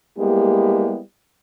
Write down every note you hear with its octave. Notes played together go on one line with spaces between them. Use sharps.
G3 G#3 A#3 B3 E4 G4